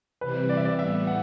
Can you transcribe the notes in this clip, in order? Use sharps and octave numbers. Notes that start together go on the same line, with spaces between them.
C3 E3 G3 C4 B4
D5
E5
D5
A2 E3 G3 B3 E5
F#5